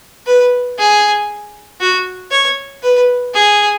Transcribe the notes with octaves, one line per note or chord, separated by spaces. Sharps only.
B4
G#4
F#4
C#5
B4
G#4